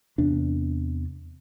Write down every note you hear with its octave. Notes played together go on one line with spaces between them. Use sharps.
E2 C3 B3 D4